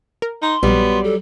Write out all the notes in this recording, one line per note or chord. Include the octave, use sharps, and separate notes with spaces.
A#4
D#4 C6
A#1 F#3 G3 B3
A4